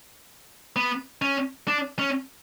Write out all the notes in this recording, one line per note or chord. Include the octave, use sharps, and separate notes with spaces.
B3
C#4
D4
C#4